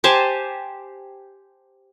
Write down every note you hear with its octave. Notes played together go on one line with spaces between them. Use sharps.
G4 C5 G#5 A5